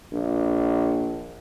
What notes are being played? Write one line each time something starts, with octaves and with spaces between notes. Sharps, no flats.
A#1